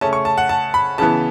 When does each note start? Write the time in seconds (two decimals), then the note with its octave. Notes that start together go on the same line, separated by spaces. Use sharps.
0.01 C#3 A3 C#4 A5
0.13 C#6
0.25 A5
0.38 F#5
0.49 A5
0.74 B5
0.98 C#3 E3 B3 A5